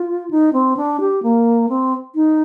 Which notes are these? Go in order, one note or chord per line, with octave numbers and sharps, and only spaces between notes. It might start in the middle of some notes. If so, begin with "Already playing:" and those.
Already playing: F4
D#4
C4
D4
G4
A#3
C4
D#4